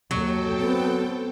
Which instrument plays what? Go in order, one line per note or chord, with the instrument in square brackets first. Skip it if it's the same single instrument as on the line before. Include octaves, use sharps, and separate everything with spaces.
[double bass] D#2 [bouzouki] F#3 [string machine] A4 G5
[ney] B3 [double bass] C4